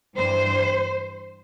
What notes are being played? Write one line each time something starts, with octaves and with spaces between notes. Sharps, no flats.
G2 E3 G3 C5